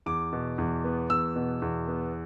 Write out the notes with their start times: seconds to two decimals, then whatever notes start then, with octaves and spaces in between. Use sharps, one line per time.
0.06 E2 D6
0.33 B2
0.58 E2
0.84 B3
1.10 E2 E6
1.36 B2
1.62 E2
1.88 B3